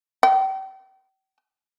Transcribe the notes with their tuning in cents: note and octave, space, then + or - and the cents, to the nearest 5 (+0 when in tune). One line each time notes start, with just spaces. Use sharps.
G5 -35